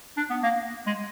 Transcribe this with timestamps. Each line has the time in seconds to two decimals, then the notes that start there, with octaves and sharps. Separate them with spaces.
0.17 D4
0.30 B3
0.43 A#3
0.87 G#3